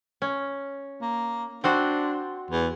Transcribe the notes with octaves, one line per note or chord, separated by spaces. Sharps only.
C#4
A#3
C4 D4 F#4 C5
E2